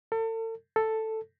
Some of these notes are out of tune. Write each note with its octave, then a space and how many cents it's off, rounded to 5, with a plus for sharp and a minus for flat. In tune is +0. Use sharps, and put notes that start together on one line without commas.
A4 +40
A4 +5